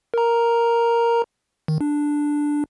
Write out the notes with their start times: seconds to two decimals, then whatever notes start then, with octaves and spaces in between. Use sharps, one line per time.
0.14 A#4 A#5
1.68 D#3
1.81 D4